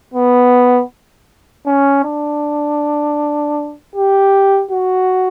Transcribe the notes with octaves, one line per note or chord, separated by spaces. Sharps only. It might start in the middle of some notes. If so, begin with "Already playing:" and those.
B3
C#4
D4
G4
F#4